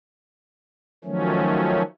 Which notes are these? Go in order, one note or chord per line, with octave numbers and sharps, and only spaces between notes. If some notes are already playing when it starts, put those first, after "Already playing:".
D#3 F3 F#3 A3 C#4